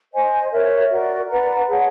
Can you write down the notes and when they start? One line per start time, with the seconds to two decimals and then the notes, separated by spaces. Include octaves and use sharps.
0.13 C5 D#5 G#5
0.52 A#4 C#5 E5
0.90 F#4 A#4 D5
1.29 B4 D5 F#5 A#5
1.68 G#4 C#5 F#5 A5